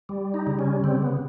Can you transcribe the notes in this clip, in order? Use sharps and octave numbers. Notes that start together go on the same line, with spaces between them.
G3
D#4
C#3
C#4
C#3 C4
B3